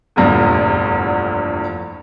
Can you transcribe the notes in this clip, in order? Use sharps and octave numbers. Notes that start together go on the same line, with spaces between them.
F1 A#1 E2 G2 D3